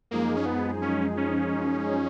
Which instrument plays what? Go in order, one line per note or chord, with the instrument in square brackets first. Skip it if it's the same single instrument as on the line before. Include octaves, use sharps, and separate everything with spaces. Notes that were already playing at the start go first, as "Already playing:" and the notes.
[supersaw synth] F#2 F3 G#3 D#4 G#4 [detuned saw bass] A#3
[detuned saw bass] C#4
B3
C#4
C#4